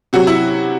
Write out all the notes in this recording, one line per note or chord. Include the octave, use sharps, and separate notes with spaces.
C3 F#3 F#4
E4